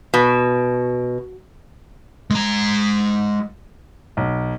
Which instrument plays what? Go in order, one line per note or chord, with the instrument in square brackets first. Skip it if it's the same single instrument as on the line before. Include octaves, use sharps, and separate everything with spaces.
[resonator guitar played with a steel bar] B2
[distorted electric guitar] G#3 A#5
[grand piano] B1